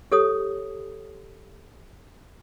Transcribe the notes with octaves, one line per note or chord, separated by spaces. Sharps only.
G4 A4 C#5 D#6